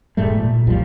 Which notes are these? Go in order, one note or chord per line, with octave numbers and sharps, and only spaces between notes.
E1 G#2 G3 A3
A#2
B1 E2 F3 G3